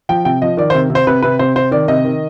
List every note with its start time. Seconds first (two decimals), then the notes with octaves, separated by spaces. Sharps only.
0.09 F3 G5
0.25 C3 G5
0.42 F3 D#5
0.57 D#3 D5
0.70 C5
0.74 C3
0.90 C3
0.95 C5
1.07 C3 B4
1.23 C3 B4
1.39 C3 C5
1.56 C3 C5
1.71 D#3 D5
1.88 C3 D#5
2.05 D#3